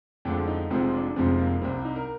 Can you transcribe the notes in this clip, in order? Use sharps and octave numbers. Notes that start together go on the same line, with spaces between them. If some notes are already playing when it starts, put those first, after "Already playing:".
F2 D3 F3 G#3 D4
D#4
F1 F2 C3 F3 G#3 C4
D4
F1 F2 C3 F3 G#3 C4
A#3
C2 C3 G3 C4
D#4
A#4